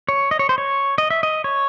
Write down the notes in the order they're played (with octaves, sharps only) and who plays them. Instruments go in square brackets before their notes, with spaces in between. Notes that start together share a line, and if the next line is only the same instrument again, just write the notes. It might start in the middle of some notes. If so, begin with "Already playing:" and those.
[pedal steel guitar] C#5
D#5
C#5
C5
C#5
D#5
E5
D#5
C#5